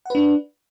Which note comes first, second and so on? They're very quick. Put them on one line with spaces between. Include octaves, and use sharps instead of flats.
F#5 B4 D4